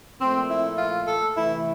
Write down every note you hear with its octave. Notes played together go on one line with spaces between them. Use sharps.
A#2 F3 A3 C4
E4
F4
A4
C3 E3 A3 E4